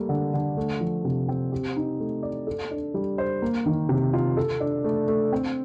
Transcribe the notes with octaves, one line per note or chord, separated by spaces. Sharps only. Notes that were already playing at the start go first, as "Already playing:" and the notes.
Already playing: G3 A3 A#3
D3
D3
A3
F3
C3
C4
G4
D#4
A3
D5
A4
D4
G3
C5
A#3
D#3
C3
F4
A4
D4
A3
A3
C4